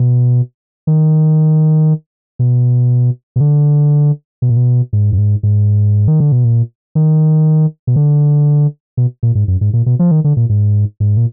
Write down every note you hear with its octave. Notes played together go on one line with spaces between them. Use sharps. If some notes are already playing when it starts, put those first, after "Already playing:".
Already playing: B2
D#3
B2
B2
D3
B2
A#2
B2
G#2
F#2
G#2
G#2
D#3
D3
B2
A#2
D#3
B2
D3
B2
A#2
G#2
F#2
G#2
A#2
B2
F3
D#3
D3
A#2
G#2
G#2
A#2